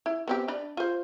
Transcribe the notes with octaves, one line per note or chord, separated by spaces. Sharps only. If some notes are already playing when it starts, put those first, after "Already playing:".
E4
B3 C4 G4
D4 D5 B5
F4 C5